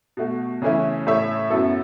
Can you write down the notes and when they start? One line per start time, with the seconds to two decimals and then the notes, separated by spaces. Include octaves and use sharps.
0.17 B2 A3 F#4
0.62 C#3 E3 A3 C#4 E4
1.07 A2 A3 E4 C#5 E5
1.50 F#2 F#3 B3 E4 A4